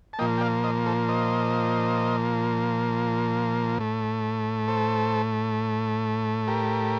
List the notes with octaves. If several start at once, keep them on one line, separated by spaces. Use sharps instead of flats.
A5
A#2 F3 A#3 D#5 G5
G5
D5 F5
C5 D#5
A4 C5
C5 D#5
A2 A3
A4 C5
G4 A#4